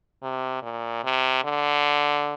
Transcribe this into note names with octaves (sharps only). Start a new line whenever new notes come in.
C3
A#2
C3
D3